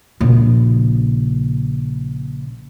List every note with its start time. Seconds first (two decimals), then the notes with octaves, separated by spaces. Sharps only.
0.20 A#1 C#3